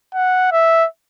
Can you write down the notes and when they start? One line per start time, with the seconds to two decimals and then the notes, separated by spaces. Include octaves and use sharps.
0.15 F#5
0.52 E5